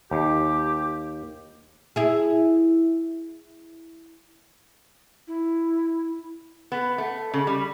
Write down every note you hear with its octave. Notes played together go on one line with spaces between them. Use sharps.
D#2 G4
E4 G#4
E4
B3
A3
C#3
G3